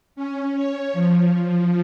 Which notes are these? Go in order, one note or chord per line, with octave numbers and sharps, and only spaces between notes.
C#4
C#5
F3
F3